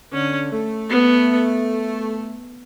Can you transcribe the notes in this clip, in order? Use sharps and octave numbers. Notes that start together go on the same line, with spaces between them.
D3 C#4
A3
B3